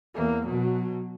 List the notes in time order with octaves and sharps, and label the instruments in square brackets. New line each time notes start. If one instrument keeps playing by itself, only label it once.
[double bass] E2 A#3
B2 F#3